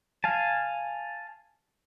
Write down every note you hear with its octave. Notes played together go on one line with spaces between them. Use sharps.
F5 G#5 A5